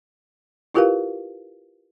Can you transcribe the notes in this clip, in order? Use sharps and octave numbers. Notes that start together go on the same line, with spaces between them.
E4 F4 G4 A#4 B4 F5